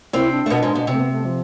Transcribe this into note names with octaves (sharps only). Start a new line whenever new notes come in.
C3 C4 E4
D4
A3
B2 B3
G#2 G#3
B2
C3 C4
A3
B3
A3
F3